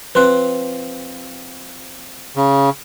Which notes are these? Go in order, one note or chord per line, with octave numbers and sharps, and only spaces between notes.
F3 C4 B4 C6 F#6
C#3